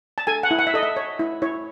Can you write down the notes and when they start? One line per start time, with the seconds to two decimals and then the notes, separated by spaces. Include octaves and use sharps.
0.18 A5
0.27 A4 G#5
0.43 F#5
0.51 E4
0.59 F#5
0.67 E5
0.74 A4 D#5
0.83 E5
0.97 C#5
1.19 E4
1.42 E4 C#5